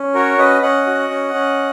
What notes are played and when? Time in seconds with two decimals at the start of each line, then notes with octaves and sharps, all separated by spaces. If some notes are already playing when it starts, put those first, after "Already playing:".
Already playing: C#4
0.14 F#4 A#4 C#5
0.38 C#4 B4 D#5
0.62 C#4 D#5 F#5
0.87 F#4
1.10 C#4
1.34 C#4